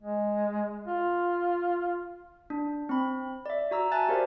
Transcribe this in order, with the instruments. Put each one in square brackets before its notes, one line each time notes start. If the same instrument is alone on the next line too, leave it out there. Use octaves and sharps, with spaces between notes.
[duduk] G#3
F4
[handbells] D4
C4 B5
D5 E5
F#4 A#5 E6
E5 G#5 A5 F#6 A6
F#4 G4 A#4 C5 D5 F5